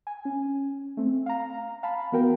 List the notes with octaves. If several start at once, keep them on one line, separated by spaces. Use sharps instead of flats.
G#5
C#4
A3 C4
F5 A#5
F5 A5 B5
E3 B3 F#4 A#4 G5